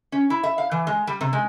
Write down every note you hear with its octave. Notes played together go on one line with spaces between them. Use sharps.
C#4
E4
E5
F5
E3
G#3
G3
C3
G#3